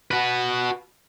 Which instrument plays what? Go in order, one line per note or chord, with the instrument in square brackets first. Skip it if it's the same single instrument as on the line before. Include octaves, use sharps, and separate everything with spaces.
[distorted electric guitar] F#4 B4